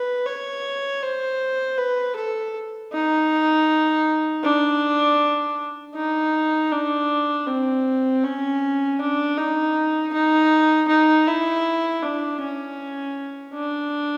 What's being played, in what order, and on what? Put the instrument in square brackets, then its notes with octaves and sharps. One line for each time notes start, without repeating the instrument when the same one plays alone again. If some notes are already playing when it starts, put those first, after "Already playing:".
Already playing: [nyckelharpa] B4
C#5
C5
B4
A4
D#4
D4
D#4
D4
C4
C#4
D4
D#4
D#4
D#4
E4
D4
C#4
D4